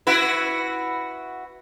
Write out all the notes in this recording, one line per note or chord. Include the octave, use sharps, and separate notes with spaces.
E4 F#4 B4